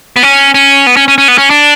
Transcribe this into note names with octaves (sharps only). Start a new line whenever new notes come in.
B3
C#4
C#4
B3
C#4
C#4
C#4
B3
C#4
D4